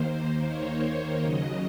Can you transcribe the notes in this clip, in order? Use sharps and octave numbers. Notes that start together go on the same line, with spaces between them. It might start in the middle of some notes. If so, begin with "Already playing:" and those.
Already playing: D#2 D#3 A#3 C5
C#5
C#5
D#2 C#3 F#3 D#5